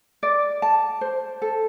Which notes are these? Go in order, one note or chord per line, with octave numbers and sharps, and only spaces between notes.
D5
A5
C5
A4